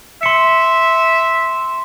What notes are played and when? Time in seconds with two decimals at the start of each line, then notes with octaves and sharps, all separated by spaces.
0.23 E5 C6 C#7